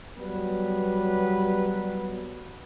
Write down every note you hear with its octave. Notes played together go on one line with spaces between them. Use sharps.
F#3 G3 B3 B4